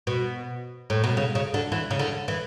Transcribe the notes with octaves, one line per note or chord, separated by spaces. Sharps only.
B2
A2
B2
C#3
C#3
D3
E3
C#3
D3
E3